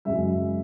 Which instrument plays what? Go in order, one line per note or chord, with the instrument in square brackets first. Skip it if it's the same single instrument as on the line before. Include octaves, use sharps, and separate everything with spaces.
[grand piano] F#2 C#3 G#3 E5